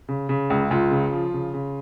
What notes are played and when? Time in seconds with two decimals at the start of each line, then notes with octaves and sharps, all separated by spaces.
0.09 C#3
0.29 C#3
0.50 C#2
0.71 C#2 F4
0.91 C#3
1.13 F3
1.33 C#3
1.54 C#3